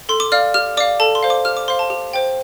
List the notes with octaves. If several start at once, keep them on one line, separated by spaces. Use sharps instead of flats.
A4 C6
D6
D5 F5 F6
G4 F6
D5 F5 D6
A4 A5
C6
C5 F5
D6
G4 F6
D6
C5 F5 C6
A5
G4
C5 G5